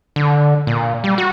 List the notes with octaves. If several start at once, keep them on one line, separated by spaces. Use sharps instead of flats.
D3
A#2
G3
F#4